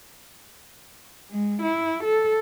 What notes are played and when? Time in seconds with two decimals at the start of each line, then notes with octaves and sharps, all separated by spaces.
1.31 G#3
1.62 E4
2.04 A4